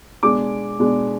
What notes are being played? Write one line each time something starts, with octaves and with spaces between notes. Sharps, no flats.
B2 G#3 D4 D6
B2 G#3 D4